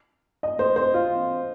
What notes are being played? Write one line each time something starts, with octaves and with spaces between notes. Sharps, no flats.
D#5
C5
C5
F4